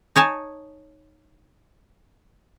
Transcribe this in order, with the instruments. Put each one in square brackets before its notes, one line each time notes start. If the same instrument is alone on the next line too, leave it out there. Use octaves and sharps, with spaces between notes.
[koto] D#4 C#5 G#5 A5